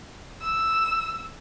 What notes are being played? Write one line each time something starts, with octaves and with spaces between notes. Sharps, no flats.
E6